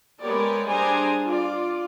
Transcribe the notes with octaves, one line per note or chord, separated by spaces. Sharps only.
G#3 B3 G4 A#4 C#5 D5
G3 D4 G#4 C5 G#5 A#5
F4 D5